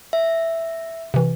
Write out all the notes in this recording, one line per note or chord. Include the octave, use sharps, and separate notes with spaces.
E5
C3 E3